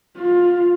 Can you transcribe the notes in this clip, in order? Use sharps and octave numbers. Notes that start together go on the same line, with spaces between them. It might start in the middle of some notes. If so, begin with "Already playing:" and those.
F4